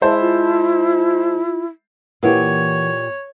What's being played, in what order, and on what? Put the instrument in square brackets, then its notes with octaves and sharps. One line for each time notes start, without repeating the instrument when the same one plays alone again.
[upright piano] G#3 C5 A5 [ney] E4 [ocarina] E5
[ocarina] F4
[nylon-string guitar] A#2 G4 [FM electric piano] E3 A#3 [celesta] A#4 B4 F#5 [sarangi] C#5